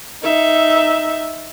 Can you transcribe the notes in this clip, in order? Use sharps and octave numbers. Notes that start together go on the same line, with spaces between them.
D#4 E5